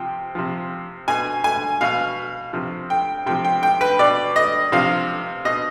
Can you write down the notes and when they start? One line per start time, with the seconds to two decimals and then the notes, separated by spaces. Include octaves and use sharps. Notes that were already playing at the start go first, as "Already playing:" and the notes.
Already playing: C3 F3 G5
0.35 C3 F3
1.08 B2 G#5
1.44 G#5
1.81 B2 F5
2.53 C3 F3
2.90 G5
3.26 C3 F3 G5
3.45 G5
3.63 G5
3.81 B4
3.99 B2 D5
4.36 D#5
4.72 C3 F3 F5
5.45 B2 D#5